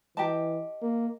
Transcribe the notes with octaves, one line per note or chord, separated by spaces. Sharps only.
E3 G4 D#5 A5
A#3